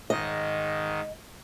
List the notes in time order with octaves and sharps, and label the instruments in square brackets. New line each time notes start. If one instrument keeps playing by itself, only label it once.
[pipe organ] G#2 D#3 [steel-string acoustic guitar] D#5